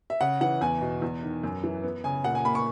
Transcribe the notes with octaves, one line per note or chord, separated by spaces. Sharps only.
E5
C#3 F#5
E3 F#5
E2 G#5
B2
E2
D#3
F#2
E3
B3
C#3 G#5
A#2 F#5
G#5
A#3 B5
C#6